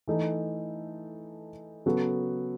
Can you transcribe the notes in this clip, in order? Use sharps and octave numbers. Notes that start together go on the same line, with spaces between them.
E3 A3 D#4 A4
C#3 F#3 B3 F#4 A4